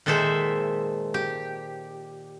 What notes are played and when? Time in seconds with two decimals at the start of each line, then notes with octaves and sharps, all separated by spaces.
0.06 A#2 D#3 G#3 A4 C5 E5
1.14 G4